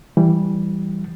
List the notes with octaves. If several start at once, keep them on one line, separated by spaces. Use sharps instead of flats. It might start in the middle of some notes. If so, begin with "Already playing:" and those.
E3 G3